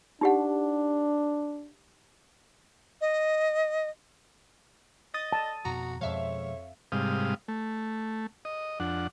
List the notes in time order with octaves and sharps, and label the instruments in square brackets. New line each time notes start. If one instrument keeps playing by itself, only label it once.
[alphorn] D4 [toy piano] D#4 G4 F#5
[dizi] D#5
[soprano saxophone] D#5 [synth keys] D#6 A6 D#7
[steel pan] A5
[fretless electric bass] F2 B2 [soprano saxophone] F#4 [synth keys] A#5
[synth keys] F2 E5 F5 [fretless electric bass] B2 F3 G#3 [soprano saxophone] C#5
[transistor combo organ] G#2 C3 G3 F5 D#6
A3
D#5
F2 D4 F#5